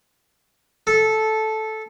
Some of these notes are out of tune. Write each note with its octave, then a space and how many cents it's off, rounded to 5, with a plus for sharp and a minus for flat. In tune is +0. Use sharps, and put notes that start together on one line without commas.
A4 -10